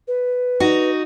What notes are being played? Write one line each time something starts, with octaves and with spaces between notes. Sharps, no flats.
B4
D#4 F#4